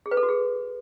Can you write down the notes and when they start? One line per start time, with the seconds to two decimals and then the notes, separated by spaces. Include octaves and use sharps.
0.06 G#4
0.11 B4
0.17 A4
0.23 F#4
0.29 G#4